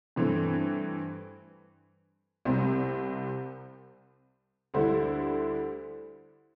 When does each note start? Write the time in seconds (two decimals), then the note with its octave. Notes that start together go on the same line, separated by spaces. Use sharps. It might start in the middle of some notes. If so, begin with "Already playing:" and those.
0.16 G2 E3 A3 C4
2.45 C2 C3 G3 C4
4.74 D2 D3 G3 E4 C5